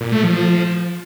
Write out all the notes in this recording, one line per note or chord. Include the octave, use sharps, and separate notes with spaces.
A#2
A3
F3